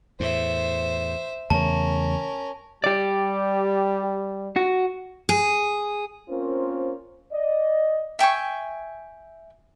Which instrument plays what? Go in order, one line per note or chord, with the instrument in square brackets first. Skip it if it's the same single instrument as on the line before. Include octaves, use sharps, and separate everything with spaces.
[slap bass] E2 A2 [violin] C5 E5
[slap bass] E2 C#3 A3 [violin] C#4 A#4 [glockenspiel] A5
[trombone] G3 [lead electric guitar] G4 D5
[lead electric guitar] F#4
[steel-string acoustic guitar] G#4
[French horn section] A#3 C4 C#4 F4 A#4 C5
D5 D#5
[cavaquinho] E5 G5 G#5 C#6